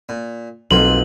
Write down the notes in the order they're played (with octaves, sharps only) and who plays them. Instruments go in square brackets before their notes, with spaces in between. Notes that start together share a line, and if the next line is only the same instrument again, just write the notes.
[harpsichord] A#2
[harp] B1 C6 D#7 [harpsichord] F2 A#3 A4 [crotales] F#7